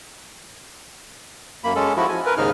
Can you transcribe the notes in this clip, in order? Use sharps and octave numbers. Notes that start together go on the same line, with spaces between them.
F#2 A#3 B5
G#3 C#4 A4
F3 E4 F#4
G#5
A#4 B4
D#2 G#2 C#3 D#4 F6